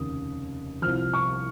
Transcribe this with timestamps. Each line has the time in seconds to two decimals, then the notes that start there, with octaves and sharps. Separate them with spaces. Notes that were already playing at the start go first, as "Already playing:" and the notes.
Already playing: F1 D#2 C#3 D#6
0.82 C2 C3 F3 F6
1.13 C#6